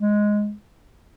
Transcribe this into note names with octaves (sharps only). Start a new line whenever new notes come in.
G#3